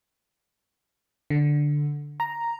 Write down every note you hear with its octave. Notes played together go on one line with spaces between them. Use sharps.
D3
A#5